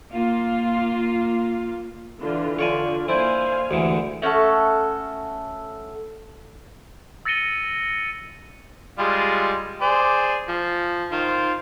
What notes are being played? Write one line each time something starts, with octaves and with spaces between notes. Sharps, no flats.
A#3 F4
D3 E3 F4
D3 F4 C#5 D5 G#5
A#3 E4 C5 D5 F5 G#5
D2 D3 E3 G#3 G4
A3 C#4 F#4 A4
E6 A6 A#6 C#7 D#7 G7
G3 G#3 F4
G#4 C5 D5
F3
D#3 F4 C5